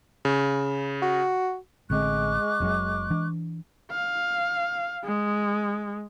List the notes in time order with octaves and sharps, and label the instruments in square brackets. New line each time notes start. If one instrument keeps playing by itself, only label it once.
[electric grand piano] C#3
[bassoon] F#4
[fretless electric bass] A1 D3 C4 [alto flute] G#3 [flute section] C#6 D6 F#6
[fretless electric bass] F#1 F#2 F#3
E3 D4
[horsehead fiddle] F5
G#3